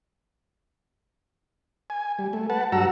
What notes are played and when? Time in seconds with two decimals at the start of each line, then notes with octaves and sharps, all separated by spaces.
1.90 G#5
2.19 G3
2.33 A3
2.50 B4 F#5 A5
2.72 G2 F#3 F#4 F#5 A#5 E6